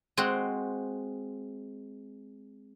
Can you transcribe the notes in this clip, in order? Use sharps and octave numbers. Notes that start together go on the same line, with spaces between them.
G#3 C4 F#4